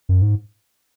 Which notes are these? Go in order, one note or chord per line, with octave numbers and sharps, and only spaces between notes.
F#2
G#2